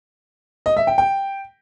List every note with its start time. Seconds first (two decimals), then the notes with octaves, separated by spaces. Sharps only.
0.66 D#5
0.77 E5
0.87 G5
0.98 G5